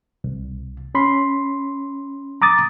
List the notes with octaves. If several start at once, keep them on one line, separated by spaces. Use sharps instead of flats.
C2
C#4 B5 C6
A#5 D6 D#6 A6